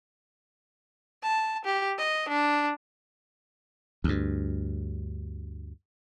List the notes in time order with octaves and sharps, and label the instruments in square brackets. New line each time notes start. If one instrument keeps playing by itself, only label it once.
[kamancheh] A5
G4
D#5
D4
[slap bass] D2 G2